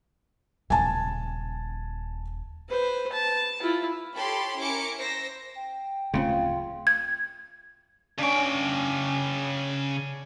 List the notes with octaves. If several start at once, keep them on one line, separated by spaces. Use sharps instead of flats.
D#1 C#3 G#5 A5
B4 C5
A5
E4 F4
G4 A4 C#5 B5 C6
C#4 E4 A#4 D6 C#7
C5 E6 A#6
G5
D1 C#3 A3 C4 F4
G#6
C#3 C#4 D4 G5